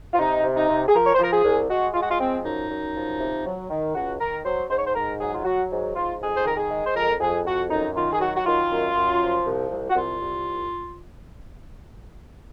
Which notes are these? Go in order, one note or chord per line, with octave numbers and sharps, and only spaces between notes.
F4
C3 D#4
C3
D#4
C3
G#4
F3 A#4
C#5
C5
F3 A#4
G#4
C2
G#3 F#4
G#3 F4
F#4
F4
F3 C4
F#2 D#4
F#2
F3
C3
F#3
D#3
C#2 F#4
D#3 A#4
F#3 C5
G#2 C5
C#5
C5
G#2 A#4
F#3 G#4
F4
F#3 F#4
G#2
G#2 F4
F2 G#4
C5
D#3 A#4
G#4
G#3
C5
F2 A#4
F2 G#4
F2 F#4
F#2 D#4
D#3 F4
G#4
F#3 F#4
F#4
D#3 F4
F#2
F#2
F3
C2
C2
F#4
C2 F4
C2